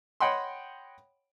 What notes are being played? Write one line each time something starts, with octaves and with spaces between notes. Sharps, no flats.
C#5 D#5 F#5 G5 B5 C6